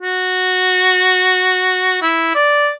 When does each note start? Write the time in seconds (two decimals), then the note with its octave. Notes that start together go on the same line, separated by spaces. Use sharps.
0.01 F#4
2.02 E4
2.35 D5